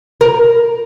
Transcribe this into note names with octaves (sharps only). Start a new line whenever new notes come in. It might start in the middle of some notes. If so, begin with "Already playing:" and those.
A#4